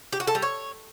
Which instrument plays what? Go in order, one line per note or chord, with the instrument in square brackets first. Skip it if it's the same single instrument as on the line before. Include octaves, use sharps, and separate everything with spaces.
[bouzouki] G4
F#4
A4
G3
C#5